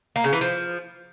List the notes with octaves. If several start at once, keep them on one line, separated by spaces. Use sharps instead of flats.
A#3
C#3
E3
F3